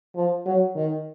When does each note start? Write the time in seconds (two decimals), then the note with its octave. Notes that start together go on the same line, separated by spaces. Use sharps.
0.15 F3
0.46 F#3
0.76 D#3